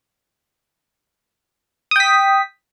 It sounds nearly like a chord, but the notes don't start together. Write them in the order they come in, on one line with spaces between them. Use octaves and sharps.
D#6 G5 B6